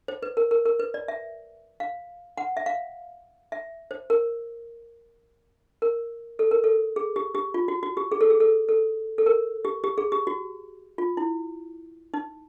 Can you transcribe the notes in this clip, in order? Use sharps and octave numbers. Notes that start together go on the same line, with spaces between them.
C5
B4
A#4
A#4
A#4
B4
D5
E5
F5
F#5
E5
F5
E5
C5
A#4
A#4
A4
A#4
A4
G#4
G4
G4
F4
F#4
F#4
G4
G#4
A4
G#4
A4
A4
A4
A#4
G4
G4
G#4
G4
F#4
F4
E4
D#4